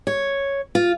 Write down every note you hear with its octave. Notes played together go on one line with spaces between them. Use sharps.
C#5
F4